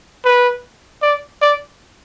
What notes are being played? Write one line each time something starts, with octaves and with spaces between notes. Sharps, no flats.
B4
D5
D5